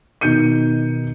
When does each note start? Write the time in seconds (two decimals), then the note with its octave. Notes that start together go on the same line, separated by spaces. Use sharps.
0.21 B2 D#3 D#4 G6 C#7 D#7